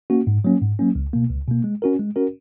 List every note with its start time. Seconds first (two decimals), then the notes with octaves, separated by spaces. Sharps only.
0.10 A#3 C#4 F#4
0.27 G#2
0.44 F#3 A#3 C#4
0.61 G#2
0.79 F#3 A#3 C#4
0.95 C#2
1.13 B2 A#3
1.30 C#2
1.48 B2 A#3
1.64 G#3
1.82 C#4 F#4 A#4
1.99 G#3
2.16 C#4 F#4 A#4